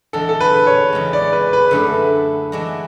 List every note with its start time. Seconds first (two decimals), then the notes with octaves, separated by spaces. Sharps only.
0.13 E2 D3 G#3 A4
0.29 A4
0.40 B4
0.67 C#5
0.93 E2 C#3 G#3
1.13 D5
1.33 B4
1.53 B4
1.71 F#2 D3 A3 E4 G#4 B4
2.52 E3 G#3 D4 F#4